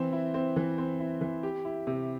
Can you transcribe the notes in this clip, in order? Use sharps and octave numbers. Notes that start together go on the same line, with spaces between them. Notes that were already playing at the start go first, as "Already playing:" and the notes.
Already playing: E3 C4
E4
C4
E3
C4
E4
E3
G4
E4
C3